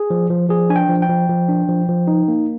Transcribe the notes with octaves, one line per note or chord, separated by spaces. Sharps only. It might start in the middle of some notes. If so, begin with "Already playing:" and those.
Already playing: G#4
F3
F3
F3 G#4
D4 G#5
G5
F3
G5
F3
F3
D4
F3
F3
D#4
A#3